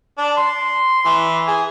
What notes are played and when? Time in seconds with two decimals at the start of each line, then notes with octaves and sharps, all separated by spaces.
0.18 D4
0.37 C6
1.05 E3
1.47 G#4